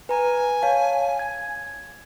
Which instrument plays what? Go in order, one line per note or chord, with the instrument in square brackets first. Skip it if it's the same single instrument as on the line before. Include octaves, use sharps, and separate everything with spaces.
[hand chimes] B4 A#5 [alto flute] G#5
[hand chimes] C#5 F5 A5
G#6